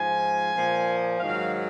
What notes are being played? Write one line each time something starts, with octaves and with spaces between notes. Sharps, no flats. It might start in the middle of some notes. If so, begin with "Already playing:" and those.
Already playing: G#2 F3 G#5
A#2 F3
G#2 D#3 F#3 F5